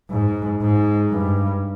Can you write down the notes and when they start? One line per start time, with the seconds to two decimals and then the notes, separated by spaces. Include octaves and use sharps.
0.11 G#2
0.61 G#2
1.12 G2